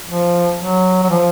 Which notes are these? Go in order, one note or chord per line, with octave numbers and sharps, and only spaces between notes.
F3
F#3
F#3
F3